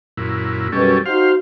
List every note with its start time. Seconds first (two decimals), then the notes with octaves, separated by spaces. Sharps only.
0.17 F#2 A#2 E4
0.72 F#2 B2 G3 C#4 A4
1.06 D#4 F#4 C5 F5